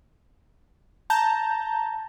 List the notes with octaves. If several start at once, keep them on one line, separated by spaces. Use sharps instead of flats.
A5 A#5 G6